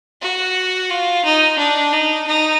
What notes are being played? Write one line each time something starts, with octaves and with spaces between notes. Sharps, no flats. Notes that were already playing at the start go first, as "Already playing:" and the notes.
F#4
F4
D#4
D4
D#4
D#4